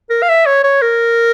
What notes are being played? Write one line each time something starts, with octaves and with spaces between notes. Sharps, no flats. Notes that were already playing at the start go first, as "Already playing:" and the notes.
A#4
F5
E5
C#5
C#5
A#4